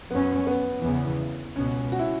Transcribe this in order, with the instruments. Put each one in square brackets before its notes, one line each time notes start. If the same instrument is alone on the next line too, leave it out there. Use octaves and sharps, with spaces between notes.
[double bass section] F#2 F#3 C#4 [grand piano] B3
[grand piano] B3
[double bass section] E2 C#3 E3 B3
[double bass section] C#2 B2 B3 [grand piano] C#4
[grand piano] F#4
E4